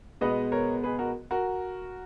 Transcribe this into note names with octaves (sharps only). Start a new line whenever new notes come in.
B2 G#3 B3 B4 D#5
A#4 C#5
G#4 B4
F#4 A#4
F#4 A#4